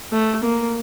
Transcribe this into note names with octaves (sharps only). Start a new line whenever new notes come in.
A3
A#3